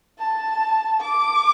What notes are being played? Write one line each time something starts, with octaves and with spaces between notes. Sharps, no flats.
A5
D6